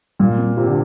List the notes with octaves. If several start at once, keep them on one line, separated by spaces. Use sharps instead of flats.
A#2 G3
C4
C3 F4
D3